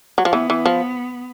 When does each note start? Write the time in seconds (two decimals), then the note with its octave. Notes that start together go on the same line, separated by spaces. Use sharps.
0.18 F#3
0.25 F3
0.33 E3 B3
0.50 E3
0.66 F3